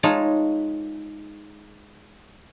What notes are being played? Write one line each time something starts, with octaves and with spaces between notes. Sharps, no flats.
G#3 D#4 F4 C#5 A5